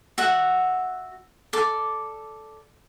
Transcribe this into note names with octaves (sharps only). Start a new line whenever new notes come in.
F#4 E5 F#5
A4 D5 D6